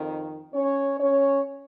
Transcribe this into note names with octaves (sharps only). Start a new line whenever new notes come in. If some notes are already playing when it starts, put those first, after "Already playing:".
Already playing: F2 D#3
C#4 C#5
C#4 C#5